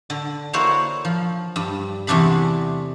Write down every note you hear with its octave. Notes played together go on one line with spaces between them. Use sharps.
D3
A#3 E4 F#4 C5 C#5
F3
G2
E2 C3 A3 D4 G#4 B5